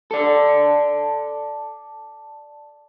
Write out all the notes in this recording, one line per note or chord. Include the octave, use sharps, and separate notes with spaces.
A4 D5